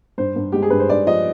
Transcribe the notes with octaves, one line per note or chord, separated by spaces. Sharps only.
G2 C5
G2
G#3 G4
G#4
G2 B4
C5
G2 D5
F3 D#5